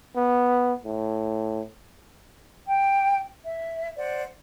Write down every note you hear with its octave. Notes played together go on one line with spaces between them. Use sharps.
B3
A2
G5
E5
C5 D5 F#5